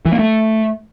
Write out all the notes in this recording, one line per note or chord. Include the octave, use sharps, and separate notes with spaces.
E3
A#3
A3